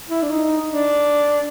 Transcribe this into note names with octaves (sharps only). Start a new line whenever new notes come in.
E4
D4
D#4
D4